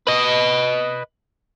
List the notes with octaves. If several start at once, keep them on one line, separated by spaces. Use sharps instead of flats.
B4 D#5